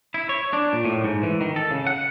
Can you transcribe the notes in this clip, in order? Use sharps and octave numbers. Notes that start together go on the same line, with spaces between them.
E4
C#5
D4
A#2
A2
G#2
E3
D#3
A4
C#3
F#5